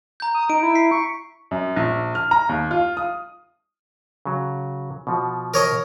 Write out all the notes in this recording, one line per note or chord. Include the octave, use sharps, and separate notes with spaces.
A#5 G6
D#6
D#4 D7
E4
B6 C7
C#6
F#2
A#1
F6
A#5
D#2
F4
D#6
C#3 F#3
B2 F3 F#4
A#4 C#5 D#5